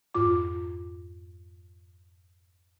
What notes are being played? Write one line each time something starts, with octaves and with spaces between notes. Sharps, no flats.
F2 G#2 F4 D6